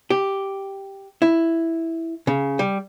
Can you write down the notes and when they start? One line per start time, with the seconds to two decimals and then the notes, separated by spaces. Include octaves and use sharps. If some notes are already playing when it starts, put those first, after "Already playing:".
0.10 G4
1.22 E4
2.27 C#3
2.59 G3